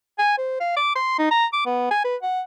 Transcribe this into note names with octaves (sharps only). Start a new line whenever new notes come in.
G#5
C5
F5
D6
C6
D#4
A#5
D6
B3
G#5
B4
F#5